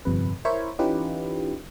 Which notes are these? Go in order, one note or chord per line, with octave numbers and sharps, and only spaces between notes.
G1 F2 C3 B4
E4 A#4 C5 C#5 E5
E3 C#4 D#4 F4 G4 B4